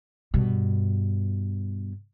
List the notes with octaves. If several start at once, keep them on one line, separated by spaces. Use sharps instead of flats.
G2 B2